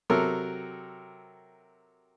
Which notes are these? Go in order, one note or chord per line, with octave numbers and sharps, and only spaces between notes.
C3 F#3 A4 A#4